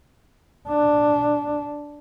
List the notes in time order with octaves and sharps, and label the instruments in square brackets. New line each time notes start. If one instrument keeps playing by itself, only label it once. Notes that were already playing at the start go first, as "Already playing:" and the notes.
[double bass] D4